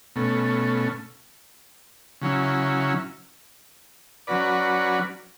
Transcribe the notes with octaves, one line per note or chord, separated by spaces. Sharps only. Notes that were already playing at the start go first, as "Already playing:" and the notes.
B2 A3 C#4
C#3 F#3 C#4 E4
F#3 C#4 F#4 B4 D5